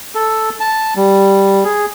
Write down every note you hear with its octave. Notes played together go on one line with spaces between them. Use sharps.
A4
A5
G3
G#4